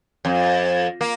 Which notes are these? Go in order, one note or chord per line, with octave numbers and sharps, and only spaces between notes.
F2
A#3